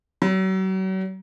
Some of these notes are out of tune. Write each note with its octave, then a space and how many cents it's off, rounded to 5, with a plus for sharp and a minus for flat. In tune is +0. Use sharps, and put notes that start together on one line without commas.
F#3 +40